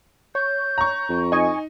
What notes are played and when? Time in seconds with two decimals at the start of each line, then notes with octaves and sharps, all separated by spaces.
0.35 C#5 G6
0.78 A#5 C#6
1.09 F2
1.32 D#4 D#5 G#5 C#6